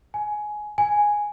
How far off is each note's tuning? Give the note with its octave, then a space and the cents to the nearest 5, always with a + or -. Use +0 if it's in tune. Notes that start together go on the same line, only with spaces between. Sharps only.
G#5 +15
G#5 +0